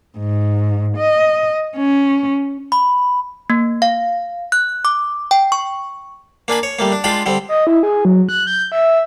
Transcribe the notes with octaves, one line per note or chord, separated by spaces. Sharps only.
G#2
D#5
C#4
B5
A#3
F5
F#6
D6
G5
C#6
A#3 D4 G#5 B5
C#5
G3 A3 A#3
D4
G#3 D4 F4 G5 B5
D3 G3 C4
D#5
E4
G#4
F#3
F#6
G6
E5